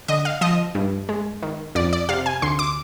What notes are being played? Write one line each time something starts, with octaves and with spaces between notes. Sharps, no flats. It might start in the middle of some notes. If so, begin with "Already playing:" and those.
D3 D#5
F5
F3 D#5
G2
G#3
D#3
F2 D5
D5
C3 F5
G#5
D2 C6
D6